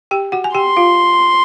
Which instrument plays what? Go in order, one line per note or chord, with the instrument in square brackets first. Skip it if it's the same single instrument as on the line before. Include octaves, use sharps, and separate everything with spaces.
[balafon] G4 G5
F#4 F#5
G#5
[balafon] G4 G5 [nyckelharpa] C6
[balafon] F4 F5